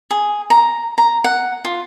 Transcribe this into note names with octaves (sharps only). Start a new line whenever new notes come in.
G#4
A#5
A#5
F#5
F4